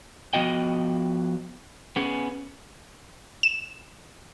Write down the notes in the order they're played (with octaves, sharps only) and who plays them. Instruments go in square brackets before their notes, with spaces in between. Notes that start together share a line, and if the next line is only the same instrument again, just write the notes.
[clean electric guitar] F3 B3 F#4 D#5 G5
B3 C#4 G#4
[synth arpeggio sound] E7